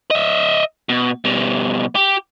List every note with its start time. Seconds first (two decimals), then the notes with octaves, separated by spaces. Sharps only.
0.11 D#5 E5
0.89 B2
1.25 B2 G3
1.95 G4